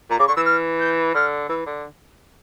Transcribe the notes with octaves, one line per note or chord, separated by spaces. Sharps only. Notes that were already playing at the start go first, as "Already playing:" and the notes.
A#2 A#5
C#3 D6
D3 C#6
E3 E6
F6
G6
D3 F6
E3 E6
D3